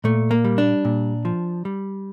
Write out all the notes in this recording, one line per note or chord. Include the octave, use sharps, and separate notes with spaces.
A#2 A3
A#3
G3
D4
A#2
F3
G3